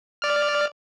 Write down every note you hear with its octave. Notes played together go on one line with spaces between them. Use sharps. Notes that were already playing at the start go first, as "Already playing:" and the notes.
D5 F6